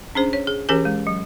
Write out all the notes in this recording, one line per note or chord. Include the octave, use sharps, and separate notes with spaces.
C#4 D4 G#4 C5
C#5
G#4
E3 C#4 G4 G#4 A#4 G#5
G#3
F#3